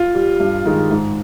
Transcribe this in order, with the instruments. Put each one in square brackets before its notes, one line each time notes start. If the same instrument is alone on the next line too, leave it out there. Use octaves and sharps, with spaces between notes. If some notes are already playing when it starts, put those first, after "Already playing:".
Already playing: [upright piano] F4
G3
G2
D#3 G#3
G#2